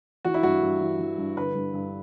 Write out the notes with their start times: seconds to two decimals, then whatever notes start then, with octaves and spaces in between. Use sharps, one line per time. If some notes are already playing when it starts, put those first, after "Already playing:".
0.25 E3 F#4
0.34 E4
0.43 G2 F#4
0.62 G2
0.81 E3
0.99 E3
1.18 G2
1.37 D3 B4
1.55 G2
1.74 G2